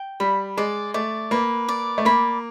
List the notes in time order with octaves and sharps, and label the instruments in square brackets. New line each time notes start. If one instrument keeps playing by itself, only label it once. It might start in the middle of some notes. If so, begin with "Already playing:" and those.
Already playing: [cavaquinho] G5
[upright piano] G3 [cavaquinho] B5
[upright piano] G#3 [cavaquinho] D5
[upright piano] A3 [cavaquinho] D5
[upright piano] A#3 [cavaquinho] B4
[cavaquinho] D5
[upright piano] A3
[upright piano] A#3 [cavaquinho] B5